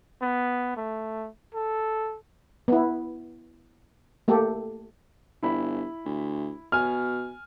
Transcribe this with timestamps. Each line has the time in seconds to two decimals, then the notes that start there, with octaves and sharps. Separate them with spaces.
0.22 B3
0.77 A3
1.54 A4
2.68 B3 E4
4.28 A3 A#3 G4 A4
5.43 G1 E4 B5
6.05 D2
6.72 B2 G#5 F6